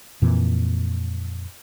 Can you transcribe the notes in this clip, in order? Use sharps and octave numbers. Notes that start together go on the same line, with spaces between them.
F2 A#2 E3